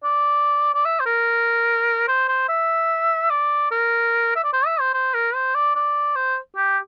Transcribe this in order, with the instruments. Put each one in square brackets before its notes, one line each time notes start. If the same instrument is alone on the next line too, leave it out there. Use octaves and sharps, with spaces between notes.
[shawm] D5
D5
E5
C5
A#4
C5
C5
E5
D5
A#4
E5
D5
C5
E5
C5
C5
A#4
C5
D5
D5
C5
G4